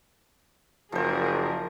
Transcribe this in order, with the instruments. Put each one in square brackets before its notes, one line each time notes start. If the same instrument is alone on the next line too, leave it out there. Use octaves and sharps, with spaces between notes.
[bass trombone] F#1 [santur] F3 C5 [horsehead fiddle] G#4 A#4